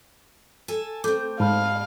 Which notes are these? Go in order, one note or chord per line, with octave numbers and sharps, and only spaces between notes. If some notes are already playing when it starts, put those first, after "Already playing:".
A4 G#5 A5
A3 C4 D6 G6
G#2 F5 A5 B5 F6